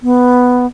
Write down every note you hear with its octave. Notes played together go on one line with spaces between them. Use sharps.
B3